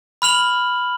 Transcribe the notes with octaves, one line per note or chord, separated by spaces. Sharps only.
B5 F6 F7 F#7